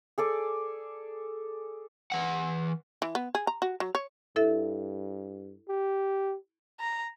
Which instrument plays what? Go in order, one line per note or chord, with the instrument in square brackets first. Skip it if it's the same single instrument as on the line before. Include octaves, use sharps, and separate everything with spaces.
[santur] G#4 A4 D5
[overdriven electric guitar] E3 F#5
[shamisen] E3
B3
G#4
A#5
F#4
F#3
C#5
[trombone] G2 [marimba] E4 A4 E5
[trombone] G4
[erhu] A#5